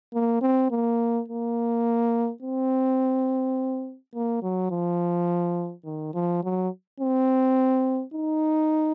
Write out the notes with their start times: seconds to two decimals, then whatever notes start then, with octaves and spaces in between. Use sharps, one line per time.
0.14 A#3
0.42 C4
0.71 A#3
1.28 A#3
2.43 C4
4.14 A#3
4.43 F#3
4.71 F3
5.85 D#3
6.14 F3
6.43 F#3
7.01 C4
8.14 D#4